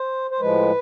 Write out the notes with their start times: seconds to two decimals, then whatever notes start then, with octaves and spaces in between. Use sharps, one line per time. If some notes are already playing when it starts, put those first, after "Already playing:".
Already playing: C5
0.31 C5
0.40 A2 F3 G#3 B4